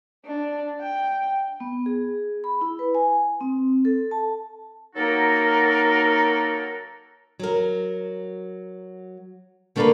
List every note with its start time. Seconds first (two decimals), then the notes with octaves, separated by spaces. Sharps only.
0.25 D4
0.80 G5
1.60 B3
1.86 G#4
2.44 B5
2.61 E4
2.79 B4
2.95 G#5
3.41 C4
3.85 A4
4.11 A5
4.95 F#3 A#3 D#4 F#4 A4 A#4
7.40 F#3 A#4
9.76 D3 A3 A#3 D4 A#4 B4